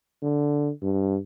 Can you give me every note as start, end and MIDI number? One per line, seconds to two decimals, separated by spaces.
0.23 0.70 50
0.83 1.18 43